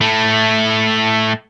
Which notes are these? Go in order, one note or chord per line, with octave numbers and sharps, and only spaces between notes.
A2 A3